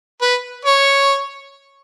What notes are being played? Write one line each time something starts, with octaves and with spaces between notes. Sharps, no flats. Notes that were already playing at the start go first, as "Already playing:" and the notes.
B4
C#5